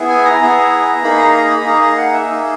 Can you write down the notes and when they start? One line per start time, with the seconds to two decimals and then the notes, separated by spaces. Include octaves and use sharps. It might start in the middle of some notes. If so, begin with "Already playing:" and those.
Already playing: B3 E4 G#4
0.09 G#5
0.25 A#5
0.41 B3 E4 G#4
1.03 A#3 D#4 G#4 B5
1.19 A#5
1.34 A#5
1.50 B5
1.66 A#3 D#4 G#4 A#5
1.81 A#5
1.97 F#5
2.13 E5
2.29 A#3 D#4 G#4